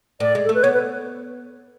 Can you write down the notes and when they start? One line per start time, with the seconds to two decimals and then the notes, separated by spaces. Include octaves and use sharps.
0.20 A2 D5
0.35 G#3
0.44 A4
0.49 A3
0.54 B4
0.63 B3 C#5
0.74 B4